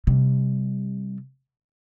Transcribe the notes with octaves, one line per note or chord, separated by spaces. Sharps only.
C3 G3